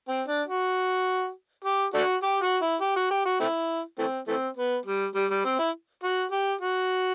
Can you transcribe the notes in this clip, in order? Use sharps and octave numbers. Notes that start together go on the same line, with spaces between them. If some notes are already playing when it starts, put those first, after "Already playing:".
C4
D4
F#4
G4
A3 D4 F#4
G4
F#4
E4
G4
F#4
G4
F#4
A3 C4 E4
E3 A3 C4
E3 A3 C4
B3
G3
G3
G3
C4
E4
F#4
G4
F#4